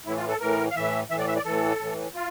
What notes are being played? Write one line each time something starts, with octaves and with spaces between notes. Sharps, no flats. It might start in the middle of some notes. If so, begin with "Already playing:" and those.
A2 E3 E4
F4
A4
A2 E3 A#4
F5
A2 E3 E5
A2 E3 E5
D5
E5
D5
A2 E3 A4
A2 E3
F4